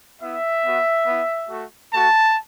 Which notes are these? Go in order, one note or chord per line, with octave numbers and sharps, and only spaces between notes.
B3 E4 E5
B3 F#4
B3 E4
A3 F#4
A3 F#4 A5